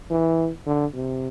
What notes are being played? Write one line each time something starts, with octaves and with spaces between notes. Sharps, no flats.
E3
D3
C3